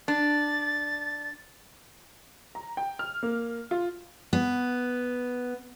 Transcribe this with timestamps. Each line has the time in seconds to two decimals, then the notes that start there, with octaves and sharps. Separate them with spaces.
0.08 D4 A6
2.55 A#5
2.77 G5
2.99 F6
3.23 A#3
3.71 F4
4.33 B3